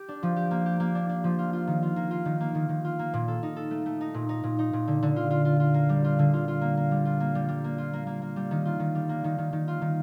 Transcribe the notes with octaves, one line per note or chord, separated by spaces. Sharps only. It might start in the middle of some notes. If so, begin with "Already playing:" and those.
Already playing: G4
D4
F3
G4
A#3
G4
A#3
D4
D4
F3
F4
F4
D#3
F4
A#3
F4
D#3
A#3
D#3
D#3
F4
A#3
A#2
A4
D#4
A4
A3
A3
D#4
A#2
D#4
A#2
D#4
A#2
D3
D3
F4
F4
F4
F4
A#3
G3
F4
D3
F4
F4
A#3
A#3
G3
F4
A#3
G3
G3
A#3
F4
A#3
A#3
A#3
G3
D#3
F4
D#3
G3
A#3
D#3
D#3
D#3
F4
D#3